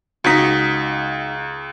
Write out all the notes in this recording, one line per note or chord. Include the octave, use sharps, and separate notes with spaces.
C#2 D#4 F#4 B6